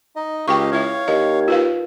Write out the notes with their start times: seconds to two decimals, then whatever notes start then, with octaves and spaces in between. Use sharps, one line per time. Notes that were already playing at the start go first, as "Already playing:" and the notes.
0.16 D#4 D#5
0.48 C#2 G4 D#5 F5 G5 C#6
0.72 E4 C#5 E5 F5
1.08 D#2 D#5
1.48 F4 B4 F5